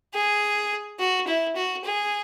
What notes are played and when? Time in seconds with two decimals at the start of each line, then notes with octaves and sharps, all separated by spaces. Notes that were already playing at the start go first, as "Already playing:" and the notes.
0.14 G#4
1.00 F#4
1.27 E4
1.56 F#4
1.85 G#4